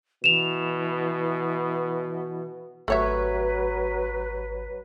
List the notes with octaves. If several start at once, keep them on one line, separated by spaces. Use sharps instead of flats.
B2 E3 E7 F7
G#1 F#3 A3 G4 B4 C#5 E5 G#6